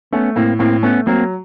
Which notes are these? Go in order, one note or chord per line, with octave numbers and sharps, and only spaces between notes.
A3 B3 C#4
A2 A#3 C4
A2 A#3 C4
A3 B3 C#4
F#3 A#3 C4